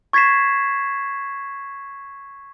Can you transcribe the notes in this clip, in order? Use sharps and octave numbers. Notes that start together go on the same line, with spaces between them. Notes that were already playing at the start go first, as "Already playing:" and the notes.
C#6 G#6 A6 B6 C7 E7